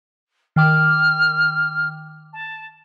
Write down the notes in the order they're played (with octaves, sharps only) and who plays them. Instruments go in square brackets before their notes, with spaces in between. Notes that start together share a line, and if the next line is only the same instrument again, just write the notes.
[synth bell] D#3 G5 D6 [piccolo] F6
[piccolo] A5